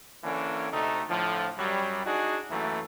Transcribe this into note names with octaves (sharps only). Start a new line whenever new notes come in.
D3 E3 A#3 C#4
D2 C3 A3 D#4
A2 D3 F3
F#2 F#3 G3
D4 D#4 F#4 G#4
F#2 E3 A3 A#3